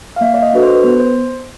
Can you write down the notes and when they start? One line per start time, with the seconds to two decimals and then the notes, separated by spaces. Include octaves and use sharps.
0.16 F5
0.21 A#3 E5
0.34 D5
0.42 D#5
0.53 D4 F#4 A4 B4
0.63 C5
0.75 B4
0.83 B3 C5
1.00 C5